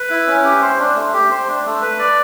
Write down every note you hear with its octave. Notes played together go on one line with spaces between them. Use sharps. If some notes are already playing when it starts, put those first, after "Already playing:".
Already playing: B4
E4
C#4
G4
C5
D4
A3
G4
C5
D4
A3
B4
D5